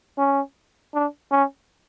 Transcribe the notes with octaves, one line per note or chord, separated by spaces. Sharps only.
C#4
D4
C#4